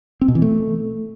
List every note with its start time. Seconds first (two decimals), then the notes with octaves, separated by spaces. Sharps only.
0.21 C4
0.28 B2
0.35 E3
0.42 A3